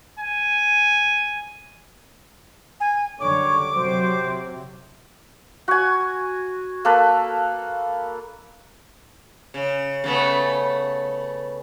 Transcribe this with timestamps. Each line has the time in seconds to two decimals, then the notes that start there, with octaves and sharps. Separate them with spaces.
0.19 G#5
2.80 G#5
3.20 F#2 D3 G3 C#5 D6
3.75 C3 F#3 C5
5.68 F#4 G#5
6.85 A#3 A4 B4
9.54 C#3
10.04 C#3 A3 B3